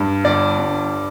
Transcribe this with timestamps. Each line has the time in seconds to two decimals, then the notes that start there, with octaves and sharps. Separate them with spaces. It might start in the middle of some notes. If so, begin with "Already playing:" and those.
Already playing: G2
0.24 G1 D5
0.59 G2